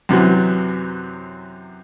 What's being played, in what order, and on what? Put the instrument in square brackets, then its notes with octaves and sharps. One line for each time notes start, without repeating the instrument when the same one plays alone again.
[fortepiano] F#2 C3 E3 F#3